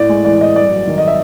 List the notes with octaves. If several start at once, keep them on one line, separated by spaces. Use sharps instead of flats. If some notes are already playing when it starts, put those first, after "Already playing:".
Already playing: A2 D5
G#3
E3 D5
A2 D#5
G2 D5
F#3
D#3
D#5
E5